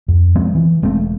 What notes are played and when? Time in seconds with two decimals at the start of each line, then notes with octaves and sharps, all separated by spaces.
0.08 F2
0.35 F3 G#3 B3 C4
0.55 E3
0.82 E1 G#3 A3 C4